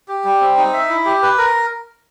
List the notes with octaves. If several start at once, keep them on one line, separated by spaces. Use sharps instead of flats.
G4
G3
C4
D#4
E5
E4
G4
B4
A#4